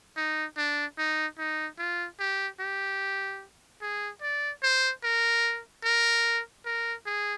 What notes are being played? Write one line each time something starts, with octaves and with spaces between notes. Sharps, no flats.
D#4
D4
D#4
D#4
F4
G4
G4
G#4
D5
C5
A#4
A#4
A#4
G#4